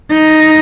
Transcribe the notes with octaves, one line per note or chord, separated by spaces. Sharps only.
D#4